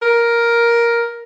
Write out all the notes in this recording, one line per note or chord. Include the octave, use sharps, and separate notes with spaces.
A#4